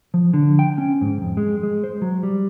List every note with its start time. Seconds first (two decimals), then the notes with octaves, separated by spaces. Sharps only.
0.14 F3
0.34 D3
0.59 G5
0.78 C#4
1.01 G#2
1.22 F2
1.37 G#3
1.63 G#3
1.84 C5
2.02 F#3
2.23 G3